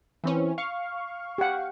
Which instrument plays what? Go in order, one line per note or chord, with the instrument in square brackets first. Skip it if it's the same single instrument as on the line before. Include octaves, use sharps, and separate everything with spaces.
[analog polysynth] E3 C4 C#4
F5 C#6
[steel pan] G4 F#5